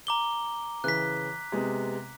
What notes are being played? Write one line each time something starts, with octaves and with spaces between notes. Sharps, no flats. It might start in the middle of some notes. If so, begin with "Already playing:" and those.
A#5 D6 G7
C#3 E3 B4 F#6 B6
C3 G#3 B3